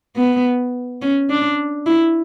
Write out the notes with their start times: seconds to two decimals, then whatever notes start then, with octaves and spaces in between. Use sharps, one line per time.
0.16 B3
1.02 C#4
1.30 D4
1.86 E4